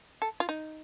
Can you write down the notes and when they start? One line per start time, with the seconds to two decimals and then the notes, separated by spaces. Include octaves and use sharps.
0.22 A4
0.40 F4
0.49 D#4